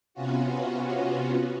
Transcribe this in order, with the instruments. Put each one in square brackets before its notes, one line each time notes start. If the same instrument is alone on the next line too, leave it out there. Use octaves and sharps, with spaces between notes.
[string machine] C3 B3 C#4 F4 F#4